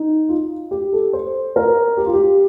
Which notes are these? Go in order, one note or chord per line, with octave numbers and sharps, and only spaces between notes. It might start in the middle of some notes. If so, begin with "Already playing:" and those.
Already playing: D#4
F4
G4
A4
C5
A#4
G4
F4
G4